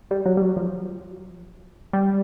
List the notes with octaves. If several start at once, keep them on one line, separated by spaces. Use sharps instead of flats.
G3
F#3
G3
F#3
F3
G3